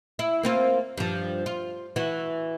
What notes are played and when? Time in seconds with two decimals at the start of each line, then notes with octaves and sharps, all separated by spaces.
0.19 E4
0.43 A#3 C4 F4
0.98 G2 F3
1.46 F4
1.96 E3 F#4